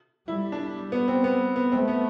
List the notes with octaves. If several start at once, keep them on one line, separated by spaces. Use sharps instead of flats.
G3 E4
D4
B3
C4
B3
B3
A3 C4
B3